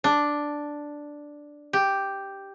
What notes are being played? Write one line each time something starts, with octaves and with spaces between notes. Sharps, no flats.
D4
G4